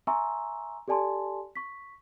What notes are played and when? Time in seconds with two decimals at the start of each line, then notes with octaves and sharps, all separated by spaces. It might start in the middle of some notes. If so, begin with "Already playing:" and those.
0.07 E5 G#5 A#5 C6 C#6 E6
0.88 G4 A4 D5 G#5 A5 C6
1.56 C#6 B6